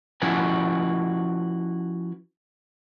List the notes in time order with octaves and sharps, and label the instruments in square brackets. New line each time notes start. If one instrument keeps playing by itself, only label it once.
[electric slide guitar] F3 C#4 E4 F#4 B4 G#5